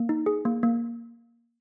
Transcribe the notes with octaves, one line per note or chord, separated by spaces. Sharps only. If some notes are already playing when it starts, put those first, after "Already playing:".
Already playing: A#3
D#4
G#4
A#3
A#3